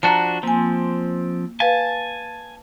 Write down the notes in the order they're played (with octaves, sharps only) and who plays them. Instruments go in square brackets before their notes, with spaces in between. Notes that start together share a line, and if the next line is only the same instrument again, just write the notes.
[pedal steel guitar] F3 D4 F#4 [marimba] A5 A#5
[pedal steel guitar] F3 C4 [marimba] A#3 G#5
[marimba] B4 F5 [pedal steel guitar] G#5 A5